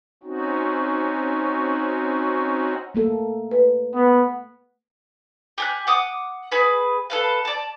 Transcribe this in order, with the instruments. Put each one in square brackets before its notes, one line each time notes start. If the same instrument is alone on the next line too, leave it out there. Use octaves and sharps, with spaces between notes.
[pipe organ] C4 C#4 D#4 F#4
[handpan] A3 A#3 A4
[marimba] B4
[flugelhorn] B3
[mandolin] G4 G#5 F#6
F#5 D6 D#6
G#4 B4
A4 B4 F5
D5 A5